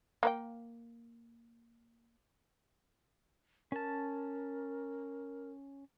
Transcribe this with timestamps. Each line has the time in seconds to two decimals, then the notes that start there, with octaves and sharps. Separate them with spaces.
0.23 A#3 B4 G5
3.72 C#4 A#4 A5